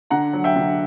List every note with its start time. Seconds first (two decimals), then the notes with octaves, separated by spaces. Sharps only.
0.10 D3 F#5 A#5
0.33 F#3
0.44 E5 G5
0.56 D3